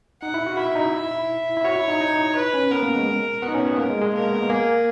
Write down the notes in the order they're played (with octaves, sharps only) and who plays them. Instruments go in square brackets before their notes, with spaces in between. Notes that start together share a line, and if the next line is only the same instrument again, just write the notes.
[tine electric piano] D#4 [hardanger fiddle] F#5
[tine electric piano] E4
F#4
[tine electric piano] E4 [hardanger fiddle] E5
[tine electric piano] D#4
E4
E4
E4
[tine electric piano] F#4 [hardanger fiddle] C#5
[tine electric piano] E4
D#4
D#4
[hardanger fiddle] B4
[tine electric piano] C#4
[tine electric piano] B3 [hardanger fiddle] A#4
[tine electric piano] A#3
G#3
[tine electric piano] B3 [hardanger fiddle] F#4
[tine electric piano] D#4
C#4
B3
[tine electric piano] A#3 [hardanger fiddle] A#4
[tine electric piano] G#3
G#3
[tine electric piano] A#3 [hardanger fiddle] A#4
[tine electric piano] B3
[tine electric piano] A#3 [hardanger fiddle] G#4